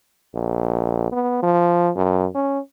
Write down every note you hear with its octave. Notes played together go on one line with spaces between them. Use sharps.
A#1
B3
F3
F#2
C#4